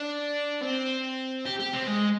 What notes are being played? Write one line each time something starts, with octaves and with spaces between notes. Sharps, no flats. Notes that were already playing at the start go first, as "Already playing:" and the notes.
Already playing: D4
C4
G4
G4
C4
G#3